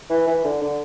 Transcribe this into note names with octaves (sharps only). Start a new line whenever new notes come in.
E3
E3
D3
D3